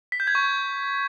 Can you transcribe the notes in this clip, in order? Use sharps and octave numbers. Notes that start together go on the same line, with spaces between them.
B6
G6
G#6
C#6